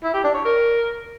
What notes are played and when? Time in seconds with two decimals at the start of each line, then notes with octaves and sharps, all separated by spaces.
0.03 E4
0.14 G4
0.24 D4
0.34 C#5
0.45 A#4